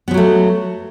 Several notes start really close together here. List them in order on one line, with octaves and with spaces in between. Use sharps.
B3 F3 F#3 A3